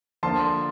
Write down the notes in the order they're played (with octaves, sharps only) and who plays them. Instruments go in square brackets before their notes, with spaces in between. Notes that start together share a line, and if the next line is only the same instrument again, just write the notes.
[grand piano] D3 F3 A#3 F4 A5 C6